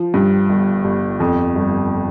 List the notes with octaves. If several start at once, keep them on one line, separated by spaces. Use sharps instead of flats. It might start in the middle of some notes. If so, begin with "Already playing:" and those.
Already playing: F3
G2
G1
G1
F2
G1